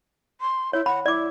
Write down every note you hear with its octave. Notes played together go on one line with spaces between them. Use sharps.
C6
E4 C#5
F#5 B5
E4 D5 D6